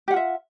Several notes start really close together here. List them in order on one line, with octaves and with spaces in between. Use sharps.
G4 F#5 F4 E5